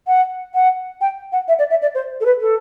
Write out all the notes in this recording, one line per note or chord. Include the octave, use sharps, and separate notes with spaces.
F#5
F#5
G5
F#5
E5
D5
E5
D5
C5
A4
B4
A4